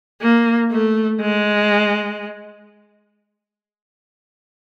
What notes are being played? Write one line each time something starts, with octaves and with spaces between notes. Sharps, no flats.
A#3
A3
G#3